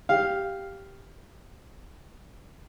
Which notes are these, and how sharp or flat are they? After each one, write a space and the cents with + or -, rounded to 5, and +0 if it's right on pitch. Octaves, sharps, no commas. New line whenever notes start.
G4 +0 F5 +0